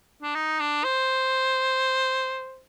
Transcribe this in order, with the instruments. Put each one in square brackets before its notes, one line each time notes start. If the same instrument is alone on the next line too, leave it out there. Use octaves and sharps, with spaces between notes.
[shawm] D4
D#4
D4
C5